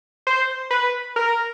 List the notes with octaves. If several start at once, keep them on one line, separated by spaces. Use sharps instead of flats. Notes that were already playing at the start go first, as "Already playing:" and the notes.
C5
B4
A#4